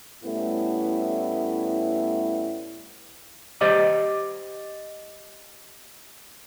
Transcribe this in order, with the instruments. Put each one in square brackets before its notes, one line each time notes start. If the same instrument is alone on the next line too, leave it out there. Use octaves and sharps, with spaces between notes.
[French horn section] A2 G3 A3 B3 C#4 E4
[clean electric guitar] G4 C5 D5 D#5